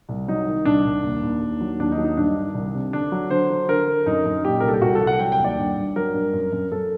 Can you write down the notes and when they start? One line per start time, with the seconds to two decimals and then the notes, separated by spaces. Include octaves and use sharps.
0.09 C2
0.28 F#3 D#4
0.46 D#3
0.65 C2 D4
0.84 C2
1.03 D#2
1.23 D#2
1.41 D#2
1.61 F#3
1.80 D#2 D4
1.92 D#4
1.98 F#3
2.04 D#4
2.17 G2 D4
2.36 D#3
2.54 C2
2.74 C3
2.93 D3 D4
3.12 F#3
3.31 D3 C5
3.50 F#3
3.68 D3 A#4
3.88 D3
4.06 F#2 D#4
4.25 F#2
4.44 A#2 G4
4.60 C2 A#4
4.68 A4
4.74 G4
4.82 C2 F#4
4.95 A4
5.01 C2
5.07 F#5
5.20 F#3 G5
5.32 G5
5.39 D#2
5.44 D5
5.58 G2
5.77 G2
5.96 F#3 A#4
6.14 G2
6.33 F#2
6.52 F#2
6.71 F#2 A4